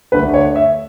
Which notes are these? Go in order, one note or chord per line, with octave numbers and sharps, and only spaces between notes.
D2 D3 A3 B4
C#5
E5